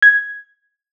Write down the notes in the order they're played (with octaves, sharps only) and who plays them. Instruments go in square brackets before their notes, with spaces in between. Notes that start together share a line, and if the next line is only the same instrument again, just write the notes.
[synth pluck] G#6